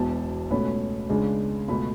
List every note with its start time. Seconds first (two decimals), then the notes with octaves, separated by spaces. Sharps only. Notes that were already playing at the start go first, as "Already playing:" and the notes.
Already playing: E1 E2 B2 A5
0.50 C#2 B2 A3 C#4 B5
1.10 C#2 C#3 G#3 D4
1.68 C#2 B2 A3 B5